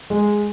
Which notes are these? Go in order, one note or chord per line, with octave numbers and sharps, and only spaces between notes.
G#3